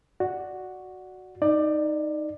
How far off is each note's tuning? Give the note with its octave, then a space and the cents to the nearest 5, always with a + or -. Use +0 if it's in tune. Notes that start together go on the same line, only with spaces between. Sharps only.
F#4 +0 D5 +0
D#4 +0 D5 +20